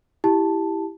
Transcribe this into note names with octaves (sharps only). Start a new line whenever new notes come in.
E4 G4 A5